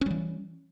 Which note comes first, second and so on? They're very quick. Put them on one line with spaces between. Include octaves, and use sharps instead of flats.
C#4 G3 E3